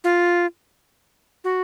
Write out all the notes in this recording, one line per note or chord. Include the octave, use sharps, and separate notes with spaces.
F4
F#4